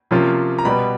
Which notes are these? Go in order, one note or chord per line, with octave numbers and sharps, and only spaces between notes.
C3 F3 A#3 C#4 F4
A#5
B2 G3 B3 B5